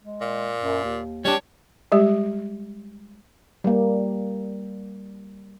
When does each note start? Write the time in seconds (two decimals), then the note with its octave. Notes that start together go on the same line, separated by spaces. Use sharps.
0.02 G#3
0.21 A#2
0.60 F#2
0.84 D#2
1.25 G3 D4 C#5
1.92 G3 G#3 G4
3.64 G3 A#3